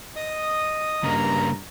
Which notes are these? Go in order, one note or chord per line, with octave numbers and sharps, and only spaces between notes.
D#5 D#6
G2 C#3 A#3 A#5